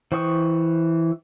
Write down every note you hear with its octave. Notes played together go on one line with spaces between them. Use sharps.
E3 C5 G5 C#6 D#6